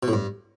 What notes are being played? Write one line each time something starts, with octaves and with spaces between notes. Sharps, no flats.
B2
A2
G2